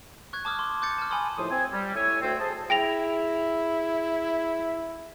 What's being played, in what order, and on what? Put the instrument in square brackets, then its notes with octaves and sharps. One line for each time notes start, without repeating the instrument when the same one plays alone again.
[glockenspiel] C#6 F#6 G#6
A5 D6 D#6 F6
C6 D6
D6 F#6 G6 A6 C#7
A5 F6
G#5 B5 C6 D#6
[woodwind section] D#2 A2 F3 F4 C5 D#6
C4 G#5
G3
A2 C#5 E5 G#5
D2 A3 C4
G#4 C5 A5 D#6
[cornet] E4 [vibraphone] G#4 [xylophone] G5 A#6 F7